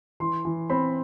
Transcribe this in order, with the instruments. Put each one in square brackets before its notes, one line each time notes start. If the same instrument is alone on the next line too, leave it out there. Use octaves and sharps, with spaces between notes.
[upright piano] E3 C6
E3
C4 B5